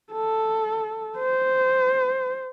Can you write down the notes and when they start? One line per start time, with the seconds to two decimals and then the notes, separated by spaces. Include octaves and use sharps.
0.12 A4
1.18 C5